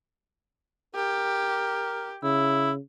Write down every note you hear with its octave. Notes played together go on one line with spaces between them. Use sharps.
G4 A#4
C#3 E4